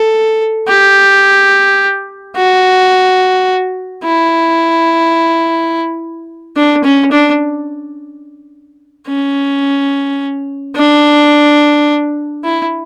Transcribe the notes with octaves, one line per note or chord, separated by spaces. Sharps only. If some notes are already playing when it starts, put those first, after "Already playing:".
Already playing: A4
G4
F#4
E4
D4
C#4
D4
C#4
D4
E4